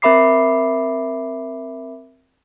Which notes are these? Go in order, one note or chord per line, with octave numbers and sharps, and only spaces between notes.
C4 A#4 E5 B5 D6 C7